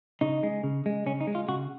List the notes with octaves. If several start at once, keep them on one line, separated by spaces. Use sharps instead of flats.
C#3 D#4
G#3
C#3
G#3
C#3 C#4
D#4
G#3
F4
C#3 F#4